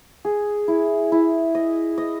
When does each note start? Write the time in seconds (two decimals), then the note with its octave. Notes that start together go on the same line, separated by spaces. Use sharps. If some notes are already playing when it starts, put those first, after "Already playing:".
0.25 G#4
0.68 E4
1.12 E4
1.55 D#5
1.98 D#5